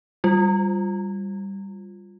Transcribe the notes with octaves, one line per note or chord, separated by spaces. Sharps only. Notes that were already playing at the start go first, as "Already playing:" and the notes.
G3 F4